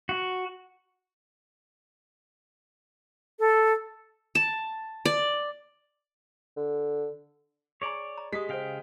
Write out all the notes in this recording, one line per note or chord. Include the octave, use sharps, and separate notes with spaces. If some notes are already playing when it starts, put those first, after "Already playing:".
F#4
A4
A5
D5
D3
G#4 C#5 D5 G#5 A#5
A#5
G#3 G4 D#6 B6
C#3 C5 E5 F5 G5